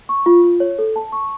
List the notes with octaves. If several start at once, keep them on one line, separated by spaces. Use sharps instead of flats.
C#6
F4
F4
C#5
A4
A5
C#6